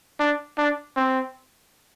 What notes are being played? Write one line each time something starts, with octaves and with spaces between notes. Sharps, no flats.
D4
D4
C4